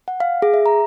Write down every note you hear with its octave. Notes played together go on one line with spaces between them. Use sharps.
F#5
F5
G#4
E5
A#5